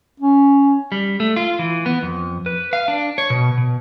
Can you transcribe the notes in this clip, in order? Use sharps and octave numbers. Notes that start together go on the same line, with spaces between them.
C#4
G3
A3
F4
E3
B3
F2
B4
F5
D4
C#5
B2
B2